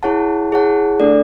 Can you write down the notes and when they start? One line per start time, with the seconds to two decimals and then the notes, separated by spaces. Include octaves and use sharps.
0.03 E4 G#4 C#5 F#5 A5
0.52 E4 G#4 C#5 F#5 A5
1.00 A3 D4 A4 D5